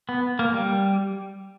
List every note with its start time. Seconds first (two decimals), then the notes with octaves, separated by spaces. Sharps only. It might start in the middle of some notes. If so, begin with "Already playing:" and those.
0.09 B3
0.39 A#3
0.54 G3